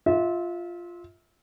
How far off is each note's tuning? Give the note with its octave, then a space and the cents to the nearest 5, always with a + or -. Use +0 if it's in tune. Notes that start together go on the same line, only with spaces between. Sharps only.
F4 +0 E5 -30